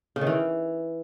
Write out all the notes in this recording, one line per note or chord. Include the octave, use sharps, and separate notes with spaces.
C#3
D#3
E3